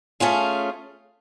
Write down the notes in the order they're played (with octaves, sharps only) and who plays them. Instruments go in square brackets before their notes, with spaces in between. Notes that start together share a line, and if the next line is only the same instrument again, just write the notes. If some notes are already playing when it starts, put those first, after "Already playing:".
[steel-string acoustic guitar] A3 C#4 F4 G#4